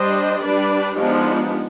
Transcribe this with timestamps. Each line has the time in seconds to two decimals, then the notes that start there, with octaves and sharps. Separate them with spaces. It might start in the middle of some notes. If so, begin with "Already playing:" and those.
Already playing: G3 D4 C5 D#5
0.43 G3 D4 B4 D5
0.97 F3 G#3 B3 D4 D#4 G4